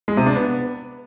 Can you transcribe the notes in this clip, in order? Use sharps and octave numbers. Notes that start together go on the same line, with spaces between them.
G#3
C3
D4
B3